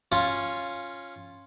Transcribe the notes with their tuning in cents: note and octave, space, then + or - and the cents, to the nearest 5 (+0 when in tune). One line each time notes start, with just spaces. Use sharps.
C#4 -5 F4 +0